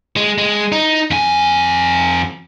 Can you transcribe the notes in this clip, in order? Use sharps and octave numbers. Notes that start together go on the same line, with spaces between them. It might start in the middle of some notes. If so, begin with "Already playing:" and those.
G#3
G#3
D#4
F2 G#5